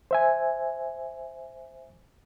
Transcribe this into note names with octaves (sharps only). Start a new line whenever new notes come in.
C5 E5 G#5